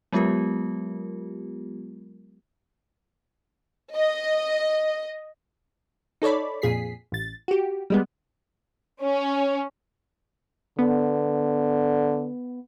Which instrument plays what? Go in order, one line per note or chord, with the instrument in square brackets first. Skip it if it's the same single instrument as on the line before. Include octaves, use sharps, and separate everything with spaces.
[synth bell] F#3 G#3 B3 F4 G4 A#4
[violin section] D#5
[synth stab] D#4 A4 C#5 D5 B5
F2 A#2 G#4 B6 C7
A1 A6
F#4 G4
G3 G#3 B3
[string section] C#4
[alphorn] D3 [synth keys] B3